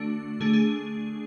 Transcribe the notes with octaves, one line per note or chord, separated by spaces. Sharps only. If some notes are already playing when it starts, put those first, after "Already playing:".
Already playing: D3 A3 D4 F#4
D3 A3 D4 G#4
G#4